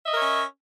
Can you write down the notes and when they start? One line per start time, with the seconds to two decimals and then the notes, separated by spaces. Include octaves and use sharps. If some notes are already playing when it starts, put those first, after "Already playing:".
0.03 E5
0.07 D#5
0.11 A#4
0.15 C#5
0.19 C#4